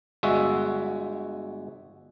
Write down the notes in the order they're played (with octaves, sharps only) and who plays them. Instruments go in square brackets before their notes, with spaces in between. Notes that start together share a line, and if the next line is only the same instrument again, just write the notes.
[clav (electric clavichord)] G1 G#3 F#4 E5